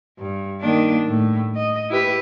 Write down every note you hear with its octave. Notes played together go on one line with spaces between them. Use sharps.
G2
D#3 A#3 D4
A2
D#5
E4 G4 B4